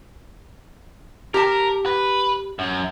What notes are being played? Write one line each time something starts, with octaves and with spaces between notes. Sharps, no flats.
G4 A#4 A5
B4
F#2